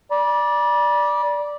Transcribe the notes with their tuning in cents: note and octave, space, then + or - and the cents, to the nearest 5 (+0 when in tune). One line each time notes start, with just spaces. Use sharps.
D5 +0 B5 -45